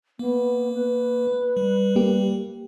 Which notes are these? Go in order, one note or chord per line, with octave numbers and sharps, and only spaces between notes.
A#3 B3
B4
G3
A#3 G4